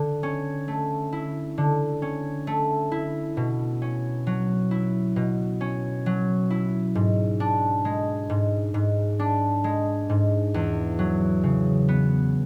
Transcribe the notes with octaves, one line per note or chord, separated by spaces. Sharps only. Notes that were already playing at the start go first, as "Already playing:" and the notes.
Already playing: D3
C#4
A3
E4
D3
C#4
A3
E4
B2
C#4
F#3
E4
B2
C#4
F#3
E4
G#2
D4
G#3
G#2
G#2
D4
G#3
G#2
E2
F#3
C#3
B3